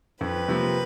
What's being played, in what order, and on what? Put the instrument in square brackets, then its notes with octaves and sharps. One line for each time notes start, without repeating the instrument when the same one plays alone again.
[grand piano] F2 [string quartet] B4
[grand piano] C3 F3 A#3